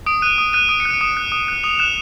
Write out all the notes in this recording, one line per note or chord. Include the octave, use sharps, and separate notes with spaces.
D#6 D7
F#6 D#7
D#6
F#6 D#7
D#6 D7
C#7
F#6
D#7
D#6 E7
F#6
D#6
F#6
D#6 F7
F#6 E7